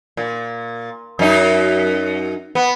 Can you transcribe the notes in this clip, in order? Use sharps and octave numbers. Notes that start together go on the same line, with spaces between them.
A#2
F#2 D#4
B3